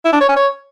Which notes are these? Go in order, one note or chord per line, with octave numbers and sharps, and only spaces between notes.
E4
D4
C#5
C#4
C#5